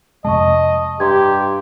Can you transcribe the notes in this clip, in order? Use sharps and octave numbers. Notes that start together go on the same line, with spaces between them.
F2 C3 G#3 D#5 A5 C#6
G2 G4 A#5 C6 G#6